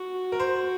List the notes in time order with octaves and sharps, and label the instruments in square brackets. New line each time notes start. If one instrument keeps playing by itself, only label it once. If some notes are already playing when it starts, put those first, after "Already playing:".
Already playing: [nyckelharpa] F#4
[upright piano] A#4
C5